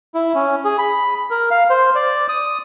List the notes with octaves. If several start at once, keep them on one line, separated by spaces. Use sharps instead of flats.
E4
C#4
G#4
B5
A#4
F5
C5
D5
D#6